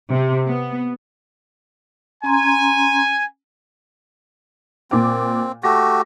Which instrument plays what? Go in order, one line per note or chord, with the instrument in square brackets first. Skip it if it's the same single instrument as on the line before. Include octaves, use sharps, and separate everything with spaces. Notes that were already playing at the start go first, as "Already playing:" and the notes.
[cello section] C3
B3
[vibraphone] C#4 A#5 C6 [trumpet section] G#5
[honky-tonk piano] A#2 D6 [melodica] C4
[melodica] A3 F#4 G4 [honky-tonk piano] A#6